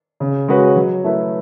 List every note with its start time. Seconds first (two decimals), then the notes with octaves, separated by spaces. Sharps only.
0.20 C#3
0.48 G#3 C#4 F#4 B4
0.76 F#3
1.04 A3 E4 B4